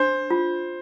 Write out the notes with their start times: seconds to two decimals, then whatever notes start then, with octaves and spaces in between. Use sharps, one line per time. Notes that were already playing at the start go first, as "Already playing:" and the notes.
Already playing: D4 C5
0.30 F4